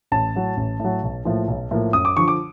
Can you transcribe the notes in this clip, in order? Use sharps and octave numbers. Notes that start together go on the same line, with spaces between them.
A1 A5
A2 F#3
A1
A2 F#3
B1
A2 F3 A#3
B1
A2 F3 A#3
F#2 D#6
D6
D3 F3 C#6
D6